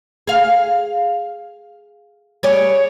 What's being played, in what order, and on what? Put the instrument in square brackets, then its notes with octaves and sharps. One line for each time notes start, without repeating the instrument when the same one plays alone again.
[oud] G#4 F5
[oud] G3 G#4 D5 [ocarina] C#5